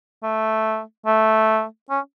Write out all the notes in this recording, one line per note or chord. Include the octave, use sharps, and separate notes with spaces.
A3
A3
C#4